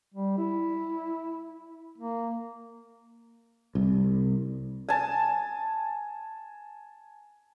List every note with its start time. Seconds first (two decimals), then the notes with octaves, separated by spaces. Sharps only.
0.14 G3
0.38 E4
1.98 A#3
3.75 C2
4.89 G#5 A5